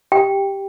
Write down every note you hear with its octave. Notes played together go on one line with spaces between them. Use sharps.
G4 G5